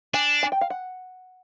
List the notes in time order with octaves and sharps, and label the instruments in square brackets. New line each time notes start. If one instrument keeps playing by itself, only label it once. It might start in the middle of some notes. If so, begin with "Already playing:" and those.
[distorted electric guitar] D4 [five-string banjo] G#5
[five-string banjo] G#5
G5
F5
F#5